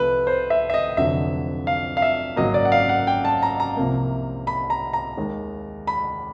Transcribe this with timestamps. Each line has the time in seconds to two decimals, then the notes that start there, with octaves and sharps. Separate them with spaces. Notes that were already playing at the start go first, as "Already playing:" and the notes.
Already playing: C2 C3 F3 A3 B4
0.27 C5
0.50 E5
0.70 E5
0.74 D#5
0.97 F1 F2 D3 F#3 E5
1.67 F5
1.97 F5
2.02 E5
2.36 G#1 F#2 C#3 F#3 A#3 D#5
2.54 D5
2.65 F#5
2.72 F5
2.89 F#5
3.07 G5
3.25 A5
3.42 A#5
3.60 A#5
3.77 C2 C3 F3 A#3
4.47 B5
4.70 A#5
4.93 A#5
5.17 D#2 D#3 G#3
5.87 B5